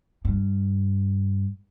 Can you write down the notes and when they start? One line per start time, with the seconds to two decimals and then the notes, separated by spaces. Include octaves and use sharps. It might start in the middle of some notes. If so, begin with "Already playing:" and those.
0.25 G2